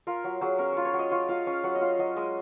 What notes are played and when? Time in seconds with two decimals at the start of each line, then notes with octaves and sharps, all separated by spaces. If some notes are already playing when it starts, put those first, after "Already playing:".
0.07 F4 A#4
0.24 F#3
0.41 F#3 G#4
0.58 C#4 A#4
0.72 F4 C#5
0.85 C#5
0.93 F#3
0.99 D#5
1.11 F4 C#5
1.29 F4 F5
1.47 C#4 F5
1.64 F#3 F#5
1.75 D#5
1.81 F4 F5
1.99 F#3 D#5
2.16 G#3 D#5